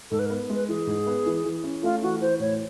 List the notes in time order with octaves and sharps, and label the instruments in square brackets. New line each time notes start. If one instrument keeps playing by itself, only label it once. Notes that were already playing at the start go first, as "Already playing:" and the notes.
[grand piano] G#2 [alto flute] A4
[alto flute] B4
[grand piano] B3 [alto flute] A#4
[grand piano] G#3 [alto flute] B4
[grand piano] E3 [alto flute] G#4
[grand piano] G#2
B3
E3
E3
C#4
[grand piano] A3 [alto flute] F4
[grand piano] E3 [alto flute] F#4
[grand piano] E3 [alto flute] C5
[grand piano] A2 [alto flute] C#5